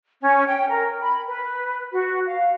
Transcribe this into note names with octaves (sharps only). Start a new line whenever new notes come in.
C#4
G5
A#4
B5
B4
F#4
F5